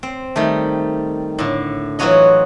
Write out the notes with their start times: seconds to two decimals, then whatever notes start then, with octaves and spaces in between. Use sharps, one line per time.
0.03 C4
0.36 D#3 G3 A3
1.39 A2 D3
1.99 E3 F#3 F4 F#4 C#5 D#5